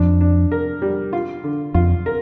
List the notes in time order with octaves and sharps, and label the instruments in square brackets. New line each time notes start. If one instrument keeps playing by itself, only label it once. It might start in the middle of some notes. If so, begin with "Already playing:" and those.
Already playing: [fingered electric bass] F2 [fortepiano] D4
[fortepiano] D4
A#4
G3
F4
D3
[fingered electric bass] F2 [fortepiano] F4
[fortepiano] A#4